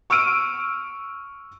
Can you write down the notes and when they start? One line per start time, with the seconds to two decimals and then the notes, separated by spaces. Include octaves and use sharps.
0.10 C#6 E6 F6 D7 D#7